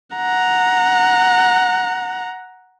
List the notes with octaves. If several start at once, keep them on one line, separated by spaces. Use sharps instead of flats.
F#5 A#5